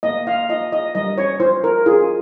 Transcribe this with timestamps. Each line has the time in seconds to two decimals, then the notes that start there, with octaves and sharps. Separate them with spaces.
0.03 A#3 D#5
0.27 F5
0.49 F4 D#5
0.72 D#5
0.95 G3 D#5
1.18 C#5
1.40 F4 C5
1.64 A#4
1.86 F4 G#4